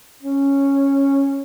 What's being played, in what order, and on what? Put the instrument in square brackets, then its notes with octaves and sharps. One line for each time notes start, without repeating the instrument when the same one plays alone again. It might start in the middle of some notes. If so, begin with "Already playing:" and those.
[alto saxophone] C#4